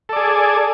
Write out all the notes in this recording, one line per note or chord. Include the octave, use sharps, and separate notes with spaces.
G#4 A4 D5